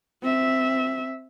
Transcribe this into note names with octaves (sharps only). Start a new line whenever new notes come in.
C4 E5